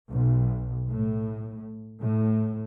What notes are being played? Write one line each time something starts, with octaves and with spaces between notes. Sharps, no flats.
B1
A2
A2